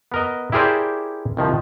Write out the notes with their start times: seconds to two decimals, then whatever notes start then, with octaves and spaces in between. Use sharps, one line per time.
0.12 B3 A#4 D#5
0.52 E4 G4 G#4 A#4 C5 D5
1.37 C2 D#3 F3